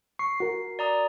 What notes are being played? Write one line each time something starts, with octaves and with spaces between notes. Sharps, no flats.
C#6 C7
F#4 A#4
D5 A#5 D#6